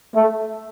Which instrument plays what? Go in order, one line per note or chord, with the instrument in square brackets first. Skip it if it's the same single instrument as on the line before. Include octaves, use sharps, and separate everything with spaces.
[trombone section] A3